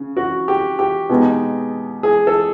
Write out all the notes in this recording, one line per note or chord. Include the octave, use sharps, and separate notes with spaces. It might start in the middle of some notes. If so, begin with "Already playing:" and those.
Already playing: C#3
F#4
G4
G4
B2 G#3 B3 D#4
G#4
A4